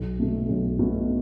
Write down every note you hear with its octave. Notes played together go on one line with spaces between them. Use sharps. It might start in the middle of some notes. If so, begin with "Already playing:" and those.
Already playing: B1
B2 A3
B1
B2 A3